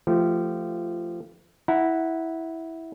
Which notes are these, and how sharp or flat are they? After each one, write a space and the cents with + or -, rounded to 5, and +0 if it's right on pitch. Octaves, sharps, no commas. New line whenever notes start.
F3 -20 A3 +0 G4 -25
E4 -10 F#5 +0 A#5 -5